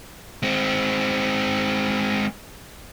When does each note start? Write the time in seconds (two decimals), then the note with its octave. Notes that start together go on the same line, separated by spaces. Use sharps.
0.43 G#3 C4